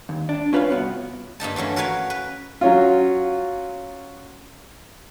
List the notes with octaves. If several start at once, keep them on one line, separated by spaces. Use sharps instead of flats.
D#2
D4
C#4 F4 B4 C#5 F5
C2 B3 F#4
G2 A#3 D#4 A5
E3 F#3 A3 C#4
F#4 A#4 B4 C#5 F5 G#5
B4
F#3 C#4 F4